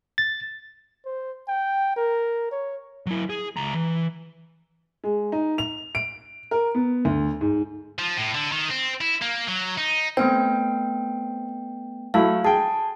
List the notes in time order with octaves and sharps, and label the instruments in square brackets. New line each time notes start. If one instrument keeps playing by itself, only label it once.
[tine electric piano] A6
[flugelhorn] C5
G5
A#4
C#5
[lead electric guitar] F#3 E4
G#4
C#2 A#5
E3
[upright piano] G#3
D#4
F7
D7
A#4
B3
D2
G#2
[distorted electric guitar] F3
A2
D3
D#3
C4
E4
A#3
F#3
D#4
[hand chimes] A3 B3 G5 [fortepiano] C4
[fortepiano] F#3 A3 E4 [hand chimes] F5
[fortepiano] G#4 G5 [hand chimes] A5